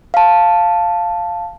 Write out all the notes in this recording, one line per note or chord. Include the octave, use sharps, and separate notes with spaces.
F5 A5